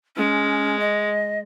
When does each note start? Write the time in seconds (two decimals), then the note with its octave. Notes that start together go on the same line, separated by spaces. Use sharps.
0.17 G#3 C#4
0.80 D#5